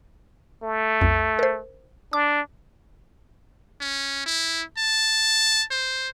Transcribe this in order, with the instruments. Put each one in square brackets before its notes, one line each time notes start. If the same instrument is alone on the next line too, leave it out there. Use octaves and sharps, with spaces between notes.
[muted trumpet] A3
[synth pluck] B1 F2
A#4 C5
[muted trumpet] D4 [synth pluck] D6
[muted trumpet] C#4
E4
A5
C5